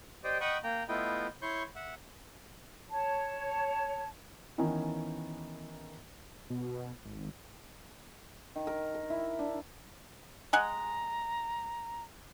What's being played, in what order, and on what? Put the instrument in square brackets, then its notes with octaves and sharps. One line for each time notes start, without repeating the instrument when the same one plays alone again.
[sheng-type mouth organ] G4 C5 D5 D#5 G5
D#5 F#5 G5 B5 C#6 D#6
A#3 G5 A#5
A3 B3 E4 F4 D#5 G5
E4 C#5 C6 C#6 G6
E5 F#5
[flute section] C#5 A5
[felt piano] D#3 E3 B3 C#4 D#4
[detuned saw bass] B2
G#1
[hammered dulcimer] D#3
A#4
A#4
E4
D4
[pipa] G#3 F#5 G#5 [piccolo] A#5